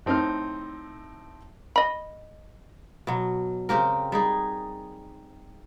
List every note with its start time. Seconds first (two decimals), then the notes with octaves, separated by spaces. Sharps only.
0.06 A2 C4 D#4 C6 F6
1.76 D#5 B5
3.07 B2 F#3
3.69 C#3 C4 G4 A#4
4.12 G3 D#4 G#4